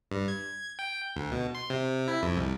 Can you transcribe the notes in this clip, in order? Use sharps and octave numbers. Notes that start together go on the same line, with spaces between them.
G2
G#6
G5
D2
B2
C6
C3
E4
F2
C2